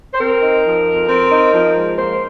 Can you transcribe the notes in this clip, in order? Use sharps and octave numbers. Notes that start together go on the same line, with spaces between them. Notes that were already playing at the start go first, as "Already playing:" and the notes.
C5
C4 A#4
D#4
F3
F2
C4
D#4
F3
G#2
A#3 C5